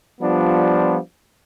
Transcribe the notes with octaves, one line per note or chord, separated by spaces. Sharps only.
F3 G3 B3 D4 F4